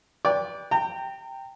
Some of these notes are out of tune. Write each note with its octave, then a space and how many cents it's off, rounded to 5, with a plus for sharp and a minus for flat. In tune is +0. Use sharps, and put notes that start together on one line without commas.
B4 -20 D5 -20 G5 +25
G5 +0 A#5 -35